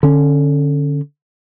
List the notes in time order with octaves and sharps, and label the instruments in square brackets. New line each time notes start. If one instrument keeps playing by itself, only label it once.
[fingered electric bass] D3 C#4